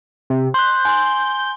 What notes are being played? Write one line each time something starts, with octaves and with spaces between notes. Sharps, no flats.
C3
C6 F#6 G6
G#5 C6